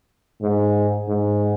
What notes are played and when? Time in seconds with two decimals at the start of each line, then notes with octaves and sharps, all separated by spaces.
0.42 G#2
1.08 G#2